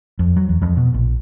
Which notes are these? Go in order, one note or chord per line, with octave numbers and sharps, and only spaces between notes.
F2
F#3
E2
F2
B2
A#1